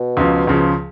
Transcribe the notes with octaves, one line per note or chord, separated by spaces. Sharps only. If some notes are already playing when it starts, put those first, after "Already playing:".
Already playing: B2
C#2 C#3 F3
C#2 C#3 F3